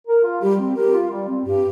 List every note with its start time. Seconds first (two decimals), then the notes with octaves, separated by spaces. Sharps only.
0.08 A#4
0.24 F4
0.42 G3 G4
0.59 C4
0.76 G4 A#4
0.94 F4
1.11 G3
1.29 C4
1.45 G2 G4